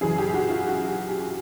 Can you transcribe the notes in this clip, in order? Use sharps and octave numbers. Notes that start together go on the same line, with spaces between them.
F#2 C#3 E3 G#4
G4
F#4
F4
F#4
G4
G4